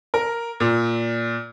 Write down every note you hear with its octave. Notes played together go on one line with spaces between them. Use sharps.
A#4
A#2